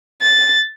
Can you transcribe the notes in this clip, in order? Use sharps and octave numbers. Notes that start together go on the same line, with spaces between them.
A6